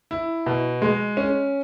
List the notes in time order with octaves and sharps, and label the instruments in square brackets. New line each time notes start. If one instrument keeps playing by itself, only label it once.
[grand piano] E4
B2
G#3
C#4